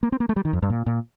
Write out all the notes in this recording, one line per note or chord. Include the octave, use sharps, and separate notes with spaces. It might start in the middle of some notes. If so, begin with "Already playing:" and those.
A#3
C4
A#3
A3
G3
D#3
F2
G2
A#2
A#2